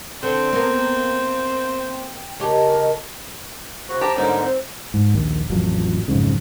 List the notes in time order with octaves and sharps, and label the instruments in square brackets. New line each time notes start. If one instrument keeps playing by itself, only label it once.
[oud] D3 [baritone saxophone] C4
[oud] A#3 B3
[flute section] G5
[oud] C#3 G4 [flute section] A#4 D#5 A5
[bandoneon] C#3 F#4 [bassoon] C5
[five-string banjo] G4 [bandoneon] A5 A#5 D6
[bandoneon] G#2 D3 D#4 [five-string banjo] G3 A#3 C#4
[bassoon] C4
[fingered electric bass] G#2
A#1 D#2
A1 F2 F3 F#3
B1 F2 G#2 C#3